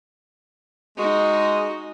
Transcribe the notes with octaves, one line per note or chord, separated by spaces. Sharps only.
G#3 D#4 F#4 D#5